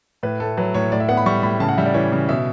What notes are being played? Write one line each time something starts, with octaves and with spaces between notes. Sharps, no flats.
A2 B4
A3 A4
F#3 B4
A2 C#5
A2 D5
E5
B3 F#5
B5
G3 C#6
A2 B5
C#3 A5
F#5
G3 E5
D5
E3 C#5
C#3
B2 E5